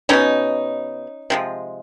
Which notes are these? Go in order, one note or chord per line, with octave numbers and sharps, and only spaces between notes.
B2 G#3 B3 C#4 D#4
C3 F3 G#3